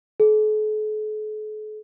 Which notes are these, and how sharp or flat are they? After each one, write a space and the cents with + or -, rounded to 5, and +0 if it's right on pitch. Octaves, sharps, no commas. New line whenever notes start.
A4 -45